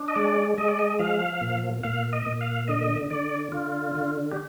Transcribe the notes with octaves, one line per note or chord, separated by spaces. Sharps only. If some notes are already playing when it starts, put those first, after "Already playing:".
Already playing: D4
D#5
G#3 D5
G#3 D#5
D5
D#5
F3 F5
A#2
A#2 F5
D#5
A#2
F5
D3 D#5
D3 D5
D3 F4
D3
G4